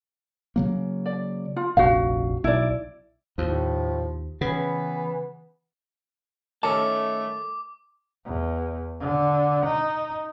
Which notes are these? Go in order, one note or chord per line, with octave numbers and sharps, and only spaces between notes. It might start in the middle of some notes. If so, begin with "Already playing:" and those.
C#3 F#3 A#3
D5
F4
F1 A#1 F#4 F5
B1 E4 D5
D#2 A2 F3
C#3 E3 B3
D#3 A3 C#4 A4 A#4 A5 D6
E2
D3
D#4